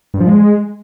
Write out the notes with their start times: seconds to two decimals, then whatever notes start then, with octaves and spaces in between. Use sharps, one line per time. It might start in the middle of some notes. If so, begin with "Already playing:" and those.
0.14 G2
0.20 F3
0.27 G#3